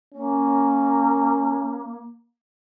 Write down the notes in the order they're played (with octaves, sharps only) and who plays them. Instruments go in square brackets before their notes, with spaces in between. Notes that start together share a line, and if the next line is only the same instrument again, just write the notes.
[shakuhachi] A#3 [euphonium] C#4